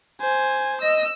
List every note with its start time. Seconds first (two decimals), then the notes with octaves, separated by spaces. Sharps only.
0.21 C5 G#5
0.81 D#5 E6